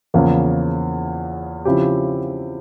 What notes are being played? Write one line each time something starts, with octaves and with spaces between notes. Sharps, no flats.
E2 C#3 F3 A#3
C#3 F3 C4 E4 G4